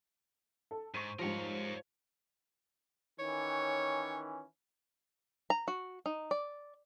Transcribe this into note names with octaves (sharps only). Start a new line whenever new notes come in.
A4
G#2 C5 C#6 D#7
G#2 F3 G3 A#4 C#5
D#3 E3 C#4 C#5
A#5
F#4
D#4
D5